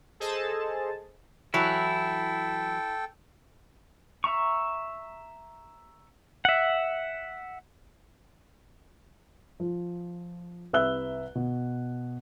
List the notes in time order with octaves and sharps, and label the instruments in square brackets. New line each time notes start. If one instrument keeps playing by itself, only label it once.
[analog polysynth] G#4 A4 C5 D#5 A5
[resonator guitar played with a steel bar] E3 F#3 [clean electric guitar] E4 [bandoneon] A4 G5
[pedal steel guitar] E5 A#5 C#6
E5 F#5
[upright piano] F3
C2 B4 E5 E6 F#6 G7
B2